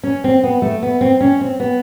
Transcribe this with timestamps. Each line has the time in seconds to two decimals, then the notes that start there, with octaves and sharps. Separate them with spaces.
0.03 C#4
0.24 C4
0.44 B3
0.62 A3
0.83 B3
1.01 C4
1.21 C#4
1.41 C4
1.60 B3